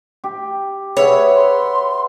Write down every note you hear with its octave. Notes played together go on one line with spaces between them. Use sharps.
G4
G#4 B4 C#5 E5 F#5
C6